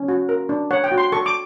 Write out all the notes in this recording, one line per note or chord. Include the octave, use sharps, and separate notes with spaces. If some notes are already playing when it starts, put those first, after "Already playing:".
Already playing: C#4
F#4
A#4
D4
C#5 F#5
G5
F#4
C6
A4 C#6
D6